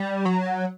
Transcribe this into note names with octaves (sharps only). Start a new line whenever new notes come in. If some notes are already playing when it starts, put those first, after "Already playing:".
Already playing: G3
F#3